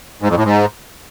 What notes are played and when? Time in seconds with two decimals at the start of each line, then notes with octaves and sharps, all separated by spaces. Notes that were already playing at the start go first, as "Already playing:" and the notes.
0.22 G#2
0.29 F2
0.37 A2
0.45 G#2